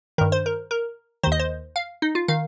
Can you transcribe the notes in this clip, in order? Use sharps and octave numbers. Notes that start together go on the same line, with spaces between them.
G2 D#3 A#4
C5
A#4
A#4
D#2 D#3 C5
D#5
C5
F5
D#4
F4
D#3 F5